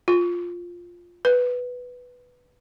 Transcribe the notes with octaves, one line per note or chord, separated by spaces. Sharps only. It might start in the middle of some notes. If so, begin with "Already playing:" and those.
F4
B4